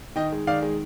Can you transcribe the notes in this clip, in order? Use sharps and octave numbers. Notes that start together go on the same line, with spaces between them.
D#3 D#5 G5
G#3
D#3 D5 F5
G#3